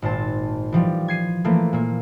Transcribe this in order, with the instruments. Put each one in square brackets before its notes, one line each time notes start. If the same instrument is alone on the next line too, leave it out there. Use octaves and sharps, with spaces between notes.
[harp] G#1 A#2 C5 A5
E3 F3 G3
G#6 C7 D#7
E3 F3 A3 A#3
A#2 A#3